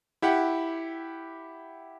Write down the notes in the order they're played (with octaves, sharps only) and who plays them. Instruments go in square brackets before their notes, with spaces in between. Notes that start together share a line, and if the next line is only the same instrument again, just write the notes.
[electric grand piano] E4 G4 F#5